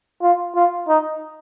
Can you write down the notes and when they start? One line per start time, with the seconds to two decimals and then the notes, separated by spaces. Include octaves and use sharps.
0.22 F4
0.55 F4
0.88 D#4